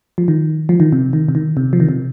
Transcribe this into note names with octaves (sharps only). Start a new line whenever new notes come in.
F3
D#3
F3
D#3
C3
D#3
C3
D#3
C3
F3
D#3
C3